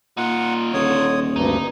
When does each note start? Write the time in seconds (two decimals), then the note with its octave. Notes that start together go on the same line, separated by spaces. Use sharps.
0.17 A#2 D#4 F4 F#5
0.74 D#1 D3 C#5 D#6
1.36 D2 G2 D#4